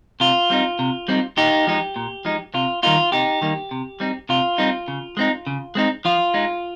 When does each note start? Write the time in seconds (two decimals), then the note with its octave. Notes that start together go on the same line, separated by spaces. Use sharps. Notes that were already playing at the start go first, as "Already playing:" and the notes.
0.20 C3 F4
0.50 G3 C4 D#4
0.79 C3
1.08 G3 C4 D#4
1.37 A#2 D#4 G4
1.67 F3 G#3 D#4
1.96 A#2
2.25 F3 G#3 D#4
2.54 C3 F4
2.83 D#3 G3 A#3 D#4 F4
3.12 C3 D#4 G4
3.41 D#3 G3 A#3 D#4
3.71 C3
4.00 G3 C4 D#4
4.29 C3 F4
4.58 G3 C4 D#4
4.88 C#3
5.17 G#3 C4 D#4
5.47 C#3
5.75 G#3 C4 D#4
6.05 F3 F4
6.34 G#3 D#4